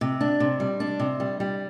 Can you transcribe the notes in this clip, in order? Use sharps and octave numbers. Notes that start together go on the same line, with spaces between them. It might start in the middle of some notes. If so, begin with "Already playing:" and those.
C3
D4
C3
G3
D4
C3
G3
G3